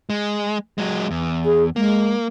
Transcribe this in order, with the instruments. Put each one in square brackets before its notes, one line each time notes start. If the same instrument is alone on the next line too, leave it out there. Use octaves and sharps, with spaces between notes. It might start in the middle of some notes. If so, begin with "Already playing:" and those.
[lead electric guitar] G#3
F#3 G#3
E2
[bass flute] G#4
[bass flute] G#3 [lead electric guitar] A#3